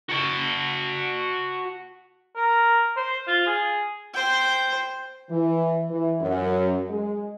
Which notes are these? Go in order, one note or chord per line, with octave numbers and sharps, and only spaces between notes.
F#4 A5
A#4
C5
F4
G#4
C5 G5
E3
E3
F#2
G#3